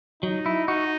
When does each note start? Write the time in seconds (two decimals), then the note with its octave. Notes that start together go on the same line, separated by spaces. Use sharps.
0.23 F#3 D#4
0.46 E4
0.68 D#4 F#4